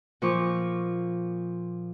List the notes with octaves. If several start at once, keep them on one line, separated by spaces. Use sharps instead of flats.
A#2 F3 F4 C#6 D6